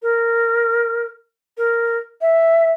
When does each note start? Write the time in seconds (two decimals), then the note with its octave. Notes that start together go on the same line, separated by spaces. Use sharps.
0.02 A#4
1.57 A#4
2.21 E5